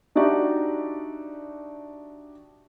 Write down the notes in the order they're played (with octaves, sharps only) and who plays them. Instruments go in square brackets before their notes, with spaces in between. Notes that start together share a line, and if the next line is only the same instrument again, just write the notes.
[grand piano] D4 D#4 F#4 G4 D5 E5